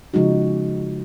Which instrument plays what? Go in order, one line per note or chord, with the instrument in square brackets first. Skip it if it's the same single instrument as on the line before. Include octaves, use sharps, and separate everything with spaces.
[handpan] C#3 F3 G#3 D#4 F#4